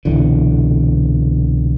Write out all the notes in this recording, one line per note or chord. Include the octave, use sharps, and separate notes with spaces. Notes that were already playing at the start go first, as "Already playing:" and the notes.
C2 B2 D3 E3